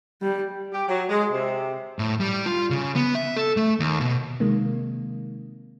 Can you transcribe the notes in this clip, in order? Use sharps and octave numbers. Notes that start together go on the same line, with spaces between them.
G3
G4
F#3
G#3
C3
A2
G3
F4
C#3
B3
E5
A4
A3
D#2
B2
C3 D#3 G#3 A#3